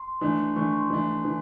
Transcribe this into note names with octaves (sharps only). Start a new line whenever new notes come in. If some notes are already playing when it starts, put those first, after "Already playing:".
Already playing: C6
E3 A3 D4
E3 A3 D4 C#6
C6
E3 A3 D4
E3